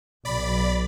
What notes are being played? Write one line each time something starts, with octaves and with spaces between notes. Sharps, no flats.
B1 D5 B5